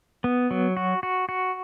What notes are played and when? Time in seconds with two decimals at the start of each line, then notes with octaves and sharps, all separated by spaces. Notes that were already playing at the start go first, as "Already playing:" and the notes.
0.24 B3
0.51 F#3
0.77 F#4
1.03 F#4
1.29 F#4